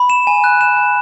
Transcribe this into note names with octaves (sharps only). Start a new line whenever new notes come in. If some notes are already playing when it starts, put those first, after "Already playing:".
Already playing: B5
E7
G#5
F#6
E7
G#5